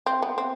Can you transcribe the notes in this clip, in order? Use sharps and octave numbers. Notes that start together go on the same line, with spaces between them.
C4
B3
C4